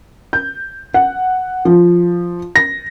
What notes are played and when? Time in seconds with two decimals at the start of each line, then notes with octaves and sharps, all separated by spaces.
0.33 G6
0.94 F#5
1.65 F3
2.56 A#6